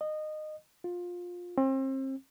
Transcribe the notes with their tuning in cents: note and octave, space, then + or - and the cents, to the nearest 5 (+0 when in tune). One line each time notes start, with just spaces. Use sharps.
D#5 -20
F4 +20
C4 +35